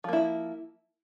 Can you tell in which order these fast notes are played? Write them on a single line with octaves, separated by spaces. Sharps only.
F3 A#3 E4